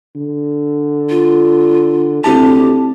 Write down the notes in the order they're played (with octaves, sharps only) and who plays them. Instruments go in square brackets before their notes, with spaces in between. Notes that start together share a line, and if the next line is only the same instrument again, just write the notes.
[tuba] D3
[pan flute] F4
[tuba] D2 [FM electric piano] C4 E4 A5 [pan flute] G4